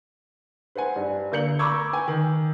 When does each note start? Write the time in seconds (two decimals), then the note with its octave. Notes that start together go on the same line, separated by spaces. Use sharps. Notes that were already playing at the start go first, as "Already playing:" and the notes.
0.75 B4 C5 F#5 G#5
0.96 G2
1.32 D3 A#3 G6 C#7 F#7
1.59 A#5 B5 C#6 D6 E6 G#6
1.93 B4 G5 G#5
2.08 D#3